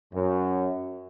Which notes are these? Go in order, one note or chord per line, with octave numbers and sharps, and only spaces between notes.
F#2